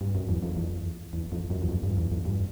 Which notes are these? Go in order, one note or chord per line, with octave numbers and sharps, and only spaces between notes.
G2
F#2
E2
F2
E2
E2
F2
F#2
E2
F2
G2
E2
F2
G2